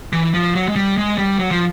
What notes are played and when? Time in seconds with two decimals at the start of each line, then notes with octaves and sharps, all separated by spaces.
0.13 E3
0.34 F3
0.55 F#3
0.68 G#3
0.76 G3
0.97 G#3
1.18 G3
1.39 F#3
1.51 F3